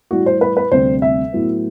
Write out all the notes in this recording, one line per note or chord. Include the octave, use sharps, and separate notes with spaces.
A2 E3 G3 F#4
C5
B4
B4
D2 C3 G3 C4 C5
E5
A2 F#3 B3